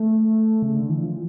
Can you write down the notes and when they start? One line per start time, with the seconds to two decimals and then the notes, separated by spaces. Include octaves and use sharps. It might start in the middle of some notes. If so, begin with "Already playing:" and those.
Already playing: A3
0.62 C#3
0.76 D3
0.89 E3
1.03 F3